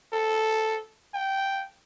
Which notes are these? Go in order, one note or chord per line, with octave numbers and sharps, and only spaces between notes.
A4
G5